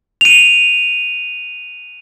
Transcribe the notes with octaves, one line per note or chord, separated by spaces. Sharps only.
D#7 F7